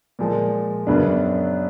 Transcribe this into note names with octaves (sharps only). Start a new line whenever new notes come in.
A#2 F3 G#3
F#2 C#3 F#3 B3 D4